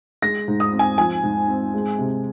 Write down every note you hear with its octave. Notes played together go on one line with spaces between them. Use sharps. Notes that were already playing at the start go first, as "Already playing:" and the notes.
G#3 A#6
G#2
D#6
C4
G#5
F3 G#5
G#2
C4
G#3
C3